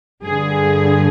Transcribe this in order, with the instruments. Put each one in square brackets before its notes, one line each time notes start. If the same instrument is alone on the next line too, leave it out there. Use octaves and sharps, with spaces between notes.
[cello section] G2 D3 G#4